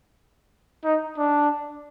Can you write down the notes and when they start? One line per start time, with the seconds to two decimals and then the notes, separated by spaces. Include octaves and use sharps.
0.84 D#4
1.18 D4